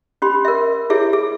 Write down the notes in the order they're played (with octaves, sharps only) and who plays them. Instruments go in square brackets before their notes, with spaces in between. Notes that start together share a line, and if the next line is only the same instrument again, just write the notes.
[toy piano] C#4 G4 B5 C6
A#4 E5
E4 G4 G#4 C#5 E5
G#4